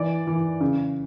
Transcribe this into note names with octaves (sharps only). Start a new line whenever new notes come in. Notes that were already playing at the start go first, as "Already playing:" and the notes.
Already playing: E3 D5
E3
C#3